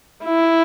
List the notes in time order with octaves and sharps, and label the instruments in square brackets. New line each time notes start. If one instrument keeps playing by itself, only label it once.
[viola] E4